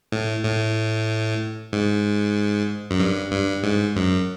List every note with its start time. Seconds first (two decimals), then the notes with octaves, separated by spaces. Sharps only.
0.12 A2
0.44 A2
1.73 G#2
2.91 F#2
3.00 G2
3.31 G2
3.63 G#2
3.96 F#2